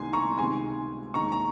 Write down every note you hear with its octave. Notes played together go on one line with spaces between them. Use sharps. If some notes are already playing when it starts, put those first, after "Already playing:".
Already playing: C2 C3 D#3 G#5 C6
A#5 C#6
C#2 C3 D#3 G#3 G#5 C6
D#2 D#3 G#3 A#5 C#6
A#5